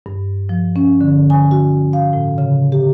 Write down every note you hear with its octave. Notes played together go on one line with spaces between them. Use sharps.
G2
F3
C#4
D3
G#5
F#4
F5
A2
C#3
G4